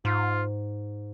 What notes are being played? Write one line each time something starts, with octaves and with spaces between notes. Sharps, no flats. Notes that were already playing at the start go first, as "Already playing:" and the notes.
G#2 F4